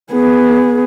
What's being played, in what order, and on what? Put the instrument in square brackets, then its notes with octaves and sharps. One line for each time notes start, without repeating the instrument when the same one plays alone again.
[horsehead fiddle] B3 G#4